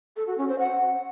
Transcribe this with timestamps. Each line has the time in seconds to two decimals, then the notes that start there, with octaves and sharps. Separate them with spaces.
0.17 A4
0.27 F#4
0.38 C#4
0.48 C5
0.59 F#5